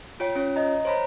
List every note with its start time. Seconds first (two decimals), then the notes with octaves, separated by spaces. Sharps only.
0.20 F4 C#5 G5
0.36 C#4 F4 C#5
0.56 D#5 A#5
0.85 C5 C#5 A#5 B5